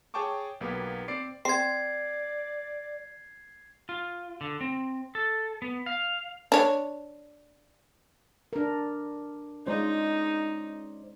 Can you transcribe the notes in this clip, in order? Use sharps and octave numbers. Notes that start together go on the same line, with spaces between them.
G#4 C#5 G5 A5 C#6 D6
B1 A#3 B3 G4
C4 D5 C7 D7
C4 D5 G#6 C7
F4
D3
C4
A4
B3
F5
D4 C#5
D4 A#4
G#3 C#4 D#4 F4 C5 D5